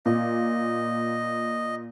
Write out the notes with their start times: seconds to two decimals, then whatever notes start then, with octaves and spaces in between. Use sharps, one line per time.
0.06 A#2 D#5